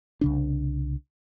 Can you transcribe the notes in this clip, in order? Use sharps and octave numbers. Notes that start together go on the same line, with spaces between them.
C2 C#3 D4